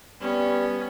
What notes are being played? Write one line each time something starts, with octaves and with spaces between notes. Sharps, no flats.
G3 B3 C#4